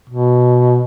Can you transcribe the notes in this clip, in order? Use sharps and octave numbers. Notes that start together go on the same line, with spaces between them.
B2